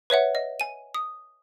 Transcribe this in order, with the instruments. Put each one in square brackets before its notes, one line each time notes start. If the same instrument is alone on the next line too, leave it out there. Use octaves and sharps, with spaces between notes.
[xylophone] B4 C#5 E5 F#5
D#5
G#5 D#7
D#6